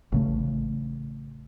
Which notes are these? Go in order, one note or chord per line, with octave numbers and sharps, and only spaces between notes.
A1 C#3 A3